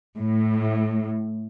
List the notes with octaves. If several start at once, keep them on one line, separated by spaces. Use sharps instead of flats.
A2